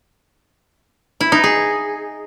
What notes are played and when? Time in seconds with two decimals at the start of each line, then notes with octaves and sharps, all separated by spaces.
1.21 E4
1.32 D#4
1.44 G#4